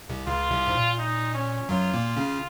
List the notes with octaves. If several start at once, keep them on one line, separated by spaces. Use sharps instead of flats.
C2 C3
C#2 C#3 F4
C2 C3
G#2
A#2
D#4
C#4
F#2 F#3 F4
A#2 A#3
C#3 C#4